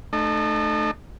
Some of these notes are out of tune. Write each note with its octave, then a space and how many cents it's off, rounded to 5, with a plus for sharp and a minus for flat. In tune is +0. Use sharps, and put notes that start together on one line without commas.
A3 -10 D#4 -40